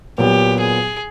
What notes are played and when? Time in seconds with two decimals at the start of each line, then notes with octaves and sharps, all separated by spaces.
0.18 A#2 F#3 B3 G4
0.60 G#4